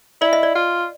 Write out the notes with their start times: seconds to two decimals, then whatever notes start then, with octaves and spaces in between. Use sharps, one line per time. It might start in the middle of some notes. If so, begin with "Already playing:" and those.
0.21 E4 D5
0.33 D#5
0.43 D5
0.55 F4